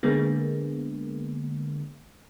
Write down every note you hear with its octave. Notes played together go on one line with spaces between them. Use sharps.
D3 G#3 A#3 B3